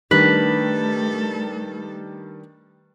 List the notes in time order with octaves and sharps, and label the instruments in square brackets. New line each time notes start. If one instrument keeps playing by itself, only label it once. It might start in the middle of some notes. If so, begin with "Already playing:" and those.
[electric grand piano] D#3 G3 D4 [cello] A3 A4 [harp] B4